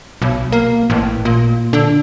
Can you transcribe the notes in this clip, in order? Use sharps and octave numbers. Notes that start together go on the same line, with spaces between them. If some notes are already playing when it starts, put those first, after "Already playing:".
B1
A#3
A1
A#2
D3